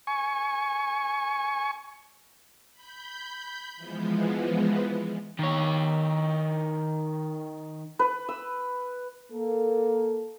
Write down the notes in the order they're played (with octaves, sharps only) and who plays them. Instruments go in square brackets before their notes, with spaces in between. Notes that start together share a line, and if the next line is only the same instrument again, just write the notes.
[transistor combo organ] G#5 C#6
[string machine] B5 G6
E3 F3 G#3 B3
[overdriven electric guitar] D#3 C#5
[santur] B4
E6
[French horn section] A#3 A4